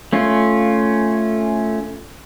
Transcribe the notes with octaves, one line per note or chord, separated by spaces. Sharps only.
A3 C#4 F4